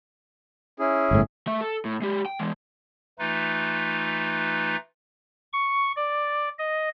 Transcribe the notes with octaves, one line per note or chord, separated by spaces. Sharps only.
C#4 E4 G#4
G1 A2
A3 E5
A4
A2
G#3 G4
G5
E3 G#3
E3 A3 D#4 F4 B4
C#6
D5
D#5